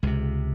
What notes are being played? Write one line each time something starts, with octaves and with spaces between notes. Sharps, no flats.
C#2 C3 G#3